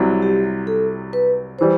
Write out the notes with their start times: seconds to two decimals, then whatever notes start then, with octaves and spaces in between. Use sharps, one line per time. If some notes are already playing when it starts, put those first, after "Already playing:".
Already playing: C2 C3 F#3
0.22 G4
0.67 A4
1.13 B4
1.59 E3 G3 C5